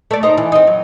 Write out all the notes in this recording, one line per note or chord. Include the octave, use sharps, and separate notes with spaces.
A3 D5
D#4 C5
E3
C4 D#4
F#3